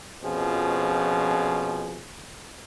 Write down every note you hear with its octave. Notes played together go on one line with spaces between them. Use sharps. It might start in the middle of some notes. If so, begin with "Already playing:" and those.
F2 B2 F3 C#4 G#4